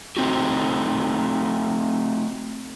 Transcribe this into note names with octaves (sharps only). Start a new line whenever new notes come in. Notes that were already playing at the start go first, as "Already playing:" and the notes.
A3 C4 D#4 F4 F#4